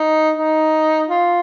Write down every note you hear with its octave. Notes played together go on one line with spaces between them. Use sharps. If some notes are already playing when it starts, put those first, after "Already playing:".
Already playing: D#4
D#4
F4